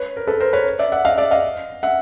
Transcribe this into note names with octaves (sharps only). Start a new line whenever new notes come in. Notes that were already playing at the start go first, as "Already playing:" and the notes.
Already playing: B4 C#5
A#4
A4 B4
A#4 C5
B4 C#5
D5 E5
E5 F#5
D#5 F5
D5 E5
D#5 F5
E5 F#5